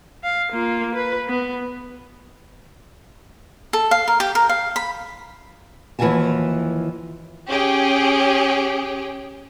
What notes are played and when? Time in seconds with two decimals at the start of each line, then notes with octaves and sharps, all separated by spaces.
0.24 F5
0.52 A#3 F4
0.95 B4
1.27 B3
3.73 A4
3.91 F5
4.08 A#4
4.20 G4
4.35 A#4
4.49 F5
4.76 B5
5.99 D#2 E3 F3 F#4 G#5 A5
7.47 C#4 G4 G#4